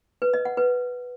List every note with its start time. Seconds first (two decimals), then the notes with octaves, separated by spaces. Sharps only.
0.22 B4
0.34 D#5
0.45 F#5
0.57 B4